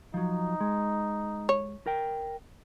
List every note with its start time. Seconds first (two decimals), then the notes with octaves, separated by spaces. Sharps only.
0.14 F3 F#3 D#4
0.61 G#3
1.49 C#5
1.86 A#4 G5